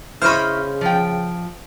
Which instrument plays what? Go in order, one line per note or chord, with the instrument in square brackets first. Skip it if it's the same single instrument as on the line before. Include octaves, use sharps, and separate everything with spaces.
[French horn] C#3 [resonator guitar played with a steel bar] E4 [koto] C5 D#5 [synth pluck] B5 C#6 F6
[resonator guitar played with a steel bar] F3 G5